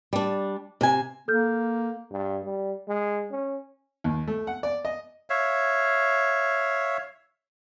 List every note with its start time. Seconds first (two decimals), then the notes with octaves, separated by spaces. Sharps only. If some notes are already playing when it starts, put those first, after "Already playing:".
0.13 G3 D4
0.81 C3 G#5
1.28 A#3 A4 F6 G6
2.11 G2
2.45 G3
2.88 G#3
3.31 C#4
4.04 D#2
4.28 A3
4.47 F#5
4.63 D5
4.85 D#5
5.30 C#5 E5 F5